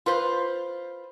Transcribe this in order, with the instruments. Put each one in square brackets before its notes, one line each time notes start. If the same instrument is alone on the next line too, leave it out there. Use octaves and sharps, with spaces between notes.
[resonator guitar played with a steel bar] F4 B4 C5